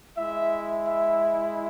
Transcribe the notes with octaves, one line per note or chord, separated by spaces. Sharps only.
G#3 E4 E5
E5